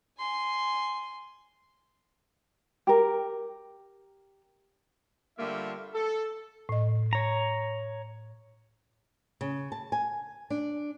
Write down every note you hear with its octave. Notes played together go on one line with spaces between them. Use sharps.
G#5 C6
G4 A#4
D3 G3 A3 A#3 F4 E5
A4
A2 D#5
C#5 A#5
C#3
A5
G#5
D4